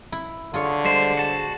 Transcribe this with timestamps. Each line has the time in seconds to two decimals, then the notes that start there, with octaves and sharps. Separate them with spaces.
0.12 E4
0.54 D3 F4 G#4 C#5
0.85 G3 G#3 C5
1.17 F#4 A5